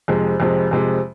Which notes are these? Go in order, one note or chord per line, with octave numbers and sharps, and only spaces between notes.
F2 C3 G#3
F2 C3 G#3
F2 C3 G#3